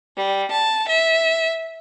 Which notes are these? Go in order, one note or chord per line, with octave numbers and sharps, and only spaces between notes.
G3
A5
E5